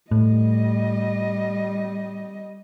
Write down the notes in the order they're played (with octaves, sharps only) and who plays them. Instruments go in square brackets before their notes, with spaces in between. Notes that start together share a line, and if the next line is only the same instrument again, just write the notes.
[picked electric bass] A2 [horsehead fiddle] G3 D#5